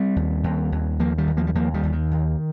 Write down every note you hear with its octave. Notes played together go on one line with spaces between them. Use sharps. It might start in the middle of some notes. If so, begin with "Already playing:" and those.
Already playing: G3 C4
D#2
D#2
D#2
D#2 F3 A#3
D#3 G3
D#2
F3 A#3
G3
D#2 F3 A#3
D#3 G3
D#2
D#3
D#2